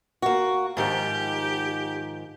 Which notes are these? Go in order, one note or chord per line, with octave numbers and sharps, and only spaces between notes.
A#3 F#4
G#2 D#3 F3 G4